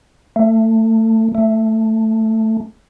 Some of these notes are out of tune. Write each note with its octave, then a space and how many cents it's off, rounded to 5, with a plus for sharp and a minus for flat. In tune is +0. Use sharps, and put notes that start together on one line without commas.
A3 +25
A3 +10